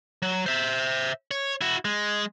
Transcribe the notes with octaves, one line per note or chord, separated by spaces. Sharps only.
F#3
C5 E5
C#5
E4 F#4
G#3